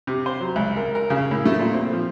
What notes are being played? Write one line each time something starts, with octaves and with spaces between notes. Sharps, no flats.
C3
C5
F#3
C#2
A#4
A#4
C#3
A2
A3
A#2
C4
F3